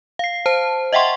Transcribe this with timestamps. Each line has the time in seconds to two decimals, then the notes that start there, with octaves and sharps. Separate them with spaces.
0.19 F5 C7
0.46 C5 A5
0.93 D#5 E5 F#5 G5 C6 C#6